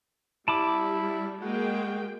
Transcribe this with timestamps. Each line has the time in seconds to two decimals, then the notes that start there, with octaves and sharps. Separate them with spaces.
0.48 G3 E4 A5 B5 D6
1.42 G#3 A#3 F#4 G5